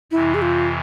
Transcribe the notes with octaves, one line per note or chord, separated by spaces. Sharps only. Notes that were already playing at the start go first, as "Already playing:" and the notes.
F2 C3 E3 E4
G#4
F4